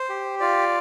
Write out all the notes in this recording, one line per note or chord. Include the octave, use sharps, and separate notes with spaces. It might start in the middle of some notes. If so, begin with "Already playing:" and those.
Already playing: C5
G4
F4 D5